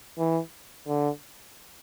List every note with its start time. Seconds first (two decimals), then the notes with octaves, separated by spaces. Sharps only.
0.19 E3
0.88 D3